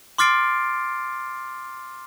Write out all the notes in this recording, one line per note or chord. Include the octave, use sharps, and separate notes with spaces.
C6 D6 F6 A6 C7 D7